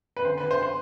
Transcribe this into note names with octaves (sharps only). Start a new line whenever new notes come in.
B4
D3 C5
B4
D3
C5
C5